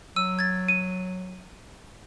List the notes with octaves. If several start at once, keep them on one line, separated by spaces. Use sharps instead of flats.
F#3 E6 D#7
G#6 A6
D#7